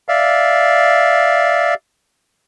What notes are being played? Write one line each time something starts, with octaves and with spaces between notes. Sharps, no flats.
D5 E5 F5